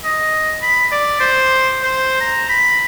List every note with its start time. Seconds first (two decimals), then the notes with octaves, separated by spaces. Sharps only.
0.04 D#5
0.63 B5
0.92 D5
1.20 C5
1.83 C5
2.21 A#5
2.50 B5